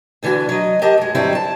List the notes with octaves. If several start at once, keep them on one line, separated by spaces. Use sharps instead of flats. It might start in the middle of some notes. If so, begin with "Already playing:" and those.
D2 D3 E3 D4 F#4
F#3 D#5
G4 A#4 D#5 A5
F#2 G#3
G2 D3 F#3 G3 C4 E4
A5